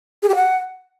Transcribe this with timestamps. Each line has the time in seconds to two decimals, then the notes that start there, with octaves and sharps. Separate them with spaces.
0.22 G#4
0.29 G4
0.35 F#5